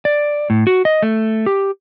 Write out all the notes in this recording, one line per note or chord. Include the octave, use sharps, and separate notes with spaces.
D5
A2
F#4
D#5
A3
G4